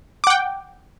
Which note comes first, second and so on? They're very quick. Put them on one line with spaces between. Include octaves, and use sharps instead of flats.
D6 F#5 G5